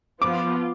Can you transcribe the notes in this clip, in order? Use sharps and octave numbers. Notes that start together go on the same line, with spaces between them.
F3 B3 F4 D6